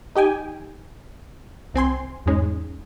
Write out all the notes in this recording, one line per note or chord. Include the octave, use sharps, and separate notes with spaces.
D#4 G4 G5 G#5
C2 C4 G#5 C6
E2 G#2 G#3 C#4 D#4